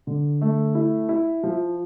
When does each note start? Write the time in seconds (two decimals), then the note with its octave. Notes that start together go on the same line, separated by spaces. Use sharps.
0.07 D3
0.41 A3
0.75 E4
1.09 E4
1.43 F3